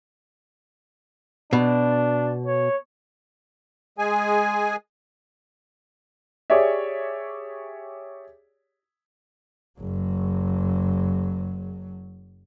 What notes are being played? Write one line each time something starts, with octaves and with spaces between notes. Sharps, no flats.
B2 D4
C#5
G#3 G#4 G#5
G4 G#4 C#5 D5 E5
F#1 F#3